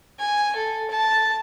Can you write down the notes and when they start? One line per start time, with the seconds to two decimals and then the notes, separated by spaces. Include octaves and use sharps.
0.19 G#5
0.56 A4
0.91 A5